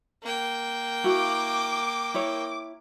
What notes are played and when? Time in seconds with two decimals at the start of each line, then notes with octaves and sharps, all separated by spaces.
0.23 A#3 G5
1.04 E4 F#4 F5 D6
2.14 E4 A#4 C#5